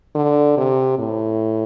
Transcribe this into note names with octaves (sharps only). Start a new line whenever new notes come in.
D3
C3
A2